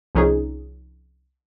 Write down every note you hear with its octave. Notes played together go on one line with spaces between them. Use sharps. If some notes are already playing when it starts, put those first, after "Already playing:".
C2 F3 C#4 D#4 G#4